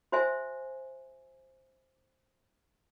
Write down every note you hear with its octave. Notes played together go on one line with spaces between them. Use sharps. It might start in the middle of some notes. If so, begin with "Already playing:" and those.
F#4 C5 E5 G#5